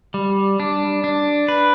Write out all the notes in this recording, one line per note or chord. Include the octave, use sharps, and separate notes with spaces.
G3
D4
D4
B4